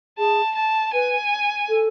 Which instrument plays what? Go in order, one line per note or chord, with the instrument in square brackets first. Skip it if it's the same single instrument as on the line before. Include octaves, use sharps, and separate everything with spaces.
[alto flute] G#4 [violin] A5
[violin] A5
[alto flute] B4 [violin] G#5
[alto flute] A4